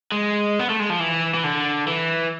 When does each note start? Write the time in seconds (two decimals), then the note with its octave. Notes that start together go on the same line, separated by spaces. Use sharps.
0.12 G#3
0.59 B3
0.70 A3
0.80 G#3
0.90 F3
1.00 E3
1.34 E3
1.44 D3
1.87 E3